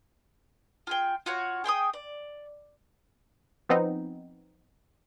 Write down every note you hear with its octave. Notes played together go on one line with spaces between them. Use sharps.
F4 G#4 G5
F4 F#4 C#5
G#4 G5 C6 D#6
D5
F3 B3 C4 D#4